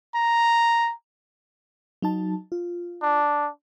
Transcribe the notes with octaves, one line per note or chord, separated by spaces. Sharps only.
A#5
F#3 D#4 A5
F4
D4